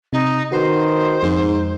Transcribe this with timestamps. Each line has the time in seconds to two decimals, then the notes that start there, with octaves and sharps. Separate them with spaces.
0.13 C3 D#4
0.52 D#3 F#4 B4 C5 C7
1.23 F2 G#2 G#3